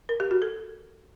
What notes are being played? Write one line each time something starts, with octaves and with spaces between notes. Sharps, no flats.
A#4
G4
F#4
A4